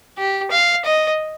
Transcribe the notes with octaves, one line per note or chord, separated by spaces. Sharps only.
G4
F5
D#5